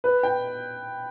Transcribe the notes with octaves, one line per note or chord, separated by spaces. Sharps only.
B4
G5